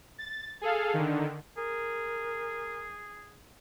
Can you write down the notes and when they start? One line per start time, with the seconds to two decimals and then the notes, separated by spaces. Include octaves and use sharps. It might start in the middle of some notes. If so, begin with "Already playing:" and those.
0.18 A6
0.61 G#4 A4 F5
0.94 D3 D#3
1.57 G#4 A#4